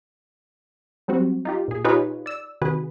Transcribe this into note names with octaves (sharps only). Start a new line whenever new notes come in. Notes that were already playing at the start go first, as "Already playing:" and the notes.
F#3 G3 C4 F#4
D#4 F4 G4
A#2 G#4
D#4 F4 G4 G#4 B4 C#5
D5 E6
C3 D#3 F#4 G#4 B4